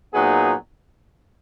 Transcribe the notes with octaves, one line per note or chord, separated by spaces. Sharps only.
A#2 F#3 B3 D#4 G#4